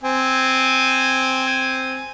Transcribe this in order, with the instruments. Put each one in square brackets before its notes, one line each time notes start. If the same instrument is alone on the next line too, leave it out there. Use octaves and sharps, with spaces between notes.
[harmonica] C4 G#5